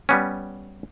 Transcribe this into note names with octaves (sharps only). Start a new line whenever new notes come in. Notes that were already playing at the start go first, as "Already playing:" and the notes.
G3 B3 C#4